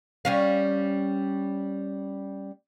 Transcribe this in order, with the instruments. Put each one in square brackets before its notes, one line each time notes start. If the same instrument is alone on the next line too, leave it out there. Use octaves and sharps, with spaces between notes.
[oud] G3 C#4 F5